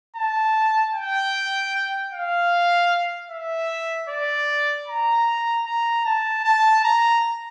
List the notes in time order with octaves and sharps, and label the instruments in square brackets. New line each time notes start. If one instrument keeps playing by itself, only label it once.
[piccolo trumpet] A5
G5
F5
E5
D5
A#5
A#5
A5
A5
A#5